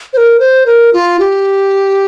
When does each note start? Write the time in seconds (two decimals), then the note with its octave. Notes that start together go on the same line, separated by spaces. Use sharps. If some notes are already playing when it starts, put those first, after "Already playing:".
0.13 C5
0.17 A#4
0.40 C5
0.66 A#4
0.93 F4
1.20 G4